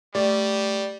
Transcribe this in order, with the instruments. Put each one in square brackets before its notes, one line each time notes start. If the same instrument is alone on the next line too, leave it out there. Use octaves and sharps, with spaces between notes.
[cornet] G3 [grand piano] A3 [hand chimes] G4 [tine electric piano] D5